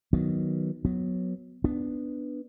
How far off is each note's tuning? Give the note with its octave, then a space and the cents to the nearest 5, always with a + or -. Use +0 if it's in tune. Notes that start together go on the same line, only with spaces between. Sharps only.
D#3 +0 F#3 +0 B3 +0
F#3 -10 B3 +5
B3 +0 D4 +0